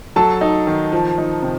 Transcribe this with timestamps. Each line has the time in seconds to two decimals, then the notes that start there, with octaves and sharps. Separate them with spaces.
0.16 F#3 A4 A5
0.41 D#4
0.67 D#3
0.92 F3
1.18 D#4
1.43 C3